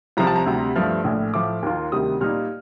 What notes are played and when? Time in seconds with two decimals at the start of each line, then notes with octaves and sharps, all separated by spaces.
0.17 C2 C3 F3 A#5
0.27 A5
0.36 A#5
0.46 D2 C3 G3
0.76 G2 F3 A3 F6
1.04 A#1 A2 A3
1.34 A2 F3 A3 D6
1.63 D#2 D#3 A#3 F4
1.92 D2 C3 D#3 G3 D#6
2.21 A#2 G3 A#3 D#4 F6